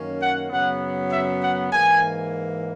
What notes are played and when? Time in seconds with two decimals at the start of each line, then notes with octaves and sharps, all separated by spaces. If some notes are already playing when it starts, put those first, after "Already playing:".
Already playing: F#2 D#3 A#3 C#4
0.20 F#5
0.50 F#2 C#3 F#3 B3 F#5
1.11 E5
1.42 F#5
1.72 G#2 E3 A#3 G#5